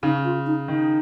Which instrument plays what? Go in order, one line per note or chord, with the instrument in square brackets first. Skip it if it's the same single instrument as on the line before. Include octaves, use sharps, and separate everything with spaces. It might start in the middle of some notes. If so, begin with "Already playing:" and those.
[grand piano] C#3 [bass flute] D#4
[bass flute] F4
D#4
[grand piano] D#3 [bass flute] D#4